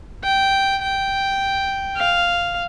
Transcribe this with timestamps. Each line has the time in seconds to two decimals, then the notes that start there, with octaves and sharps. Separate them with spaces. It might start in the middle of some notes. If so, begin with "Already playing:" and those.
0.24 G5
0.82 G5
1.97 F5